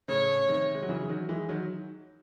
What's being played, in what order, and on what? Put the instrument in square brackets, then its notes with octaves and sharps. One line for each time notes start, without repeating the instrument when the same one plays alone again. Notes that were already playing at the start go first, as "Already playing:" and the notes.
[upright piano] A2 C#3 [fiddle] C#5
[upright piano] C3 D#3
G#3
F#3
C#3 E3
D#3 F#3
E3 G#3
D#3 F#3